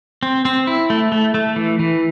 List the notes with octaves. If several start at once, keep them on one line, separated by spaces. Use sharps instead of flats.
C4
C4
E4
A3
A3
A3
E3
E3